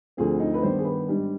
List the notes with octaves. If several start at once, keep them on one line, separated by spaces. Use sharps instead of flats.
D2 D3 F3 C4 G#4
D#4
B4
G2 D#3 B3 D4 C5
G#4
B4
G#2 G3 D4